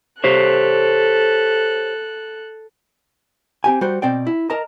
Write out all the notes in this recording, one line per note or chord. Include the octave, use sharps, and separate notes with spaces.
G4 A4 C5 C#5 F#6
C4 G4 G#5
G3 F#4 C5
B2 C4 D5 G5
E4
A#4 D#5 A5 A#5